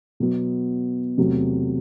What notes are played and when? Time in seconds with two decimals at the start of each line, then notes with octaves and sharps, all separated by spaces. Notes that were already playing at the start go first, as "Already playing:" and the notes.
0.20 B2 F#3 B3
1.18 E2 C3 F#3 A3